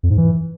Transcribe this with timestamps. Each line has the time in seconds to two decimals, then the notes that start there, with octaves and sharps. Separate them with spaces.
0.03 F2
0.10 G#2
0.18 E3